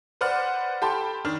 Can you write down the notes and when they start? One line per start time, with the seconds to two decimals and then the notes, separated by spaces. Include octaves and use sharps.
0.21 B4 C5 D5 F#5 F6
0.82 G4 A4 G5 A5 B5 C6
1.25 D#3 D4 F6